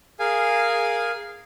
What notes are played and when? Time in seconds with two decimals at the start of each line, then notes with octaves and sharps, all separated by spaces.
0.20 G#4 A#4 F5 G#5